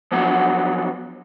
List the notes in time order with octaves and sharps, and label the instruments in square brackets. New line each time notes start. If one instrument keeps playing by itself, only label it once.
[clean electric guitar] F3 F#3 A#3 B3 D4 F#4